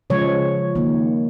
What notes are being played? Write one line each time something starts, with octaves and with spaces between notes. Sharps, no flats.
C#3 F3 G#3 C#5
D#3 A#3